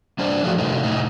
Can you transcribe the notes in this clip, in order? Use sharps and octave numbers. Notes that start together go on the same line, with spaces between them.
G3 D4 C5 D5
F3 F#3 G#3 A3 F#4
C3 D#3 A3 D#4
A2 D#4